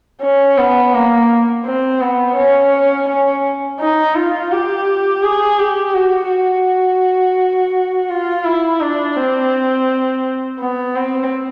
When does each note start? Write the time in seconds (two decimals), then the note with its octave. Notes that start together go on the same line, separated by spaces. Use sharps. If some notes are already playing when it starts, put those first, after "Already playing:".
0.22 C#4
0.58 B3
0.94 A#3
1.65 C4
2.01 B3
2.36 C#4
3.08 C#4
3.80 D#4
4.16 F4
4.52 G4
5.23 G#4
5.59 G4
5.94 F#4
6.30 F#4
8.09 F4
8.45 E4
8.80 D4
9.17 C4
10.60 B3
10.95 C4